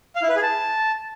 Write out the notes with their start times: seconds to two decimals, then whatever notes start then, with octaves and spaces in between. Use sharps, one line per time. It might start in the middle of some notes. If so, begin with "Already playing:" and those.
0.16 F5
0.22 E4
0.29 B4
0.36 G#4
0.43 A5